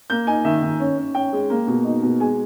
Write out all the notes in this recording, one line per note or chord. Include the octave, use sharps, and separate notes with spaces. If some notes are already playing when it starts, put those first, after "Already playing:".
A#3 G6
D#4 G#5
D#3 E5
D#3
C#4
C#4
C#4 G5
G#3
A#3
B2
D#4
B2
G#3 G#5